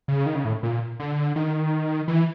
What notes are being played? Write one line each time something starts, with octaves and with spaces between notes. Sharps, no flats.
C#3
D#3
C#3
A2
A#2
D3
D#3
E3